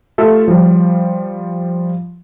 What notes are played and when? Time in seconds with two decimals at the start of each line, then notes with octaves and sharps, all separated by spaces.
0.18 A3 F4 G4 A4 E5
0.48 F3 G3